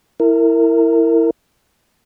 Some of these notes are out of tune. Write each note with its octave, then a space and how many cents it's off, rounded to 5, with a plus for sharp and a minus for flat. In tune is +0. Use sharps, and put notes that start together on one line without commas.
E4 +0 A#4 -25